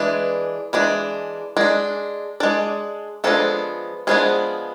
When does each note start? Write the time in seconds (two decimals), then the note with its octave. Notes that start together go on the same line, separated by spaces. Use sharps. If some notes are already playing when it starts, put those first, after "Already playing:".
Already playing: E3 G#3 D4 B4
0.73 E3 G#3 D4
1.57 G#3 D4 D5
2.40 G#3 D4 D5
3.24 F3 G#3 B3 D4 A4
4.07 F3 G#3 B3 D4 G#4